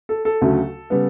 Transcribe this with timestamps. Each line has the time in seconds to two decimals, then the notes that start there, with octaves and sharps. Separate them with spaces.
0.09 A4
0.25 A4
0.41 D2 C#3 F#3 A3
0.90 C#3 G3 B3